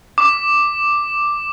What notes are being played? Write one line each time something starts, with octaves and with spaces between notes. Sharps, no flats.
D6